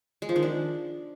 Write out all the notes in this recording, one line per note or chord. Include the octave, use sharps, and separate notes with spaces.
G#3
F3
D#3
D4